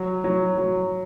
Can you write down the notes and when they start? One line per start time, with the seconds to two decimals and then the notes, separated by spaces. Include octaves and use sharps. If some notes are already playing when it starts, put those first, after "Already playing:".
Already playing: F#3
0.24 F#3
0.58 F#3